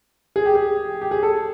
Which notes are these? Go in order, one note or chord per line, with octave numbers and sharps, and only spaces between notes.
G#4
G4
G#4
G4
G#4
A4